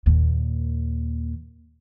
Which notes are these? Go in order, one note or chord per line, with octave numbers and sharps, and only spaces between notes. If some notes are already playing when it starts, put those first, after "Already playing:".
D#2 A#2